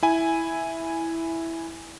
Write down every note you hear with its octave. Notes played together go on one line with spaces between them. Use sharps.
E4 G#5